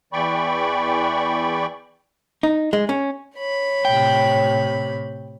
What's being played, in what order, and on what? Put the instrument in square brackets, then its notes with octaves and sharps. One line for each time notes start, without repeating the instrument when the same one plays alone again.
[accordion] E2 E3 D5 G5 B5 C#6
[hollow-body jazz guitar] D#4
G#3
C#4
[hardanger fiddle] C#5 B5
[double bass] A2 C3 [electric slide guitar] G5